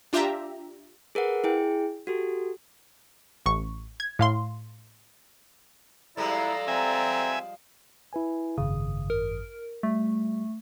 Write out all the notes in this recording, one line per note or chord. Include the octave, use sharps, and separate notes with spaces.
D4 F4 G4 E5 A#5
G#4 A#4 B4 F#5
E4 G#4 G5
F#4 G4 A4
A1 C#6
G#6
A2 F5 C6
F3 G3 G#3 E4 A4 D5 A#5
C4 E5 G#5
E4 B4 G#5
G#1 F#2 C#3 D#6
A#4
G3 A3